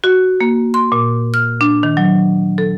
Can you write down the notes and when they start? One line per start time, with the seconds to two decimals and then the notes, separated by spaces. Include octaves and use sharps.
0.04 F#4
0.40 A#3
0.74 C6
0.92 A#2
1.34 F6
1.61 D4
1.83 D#3
1.97 F#3
2.58 A4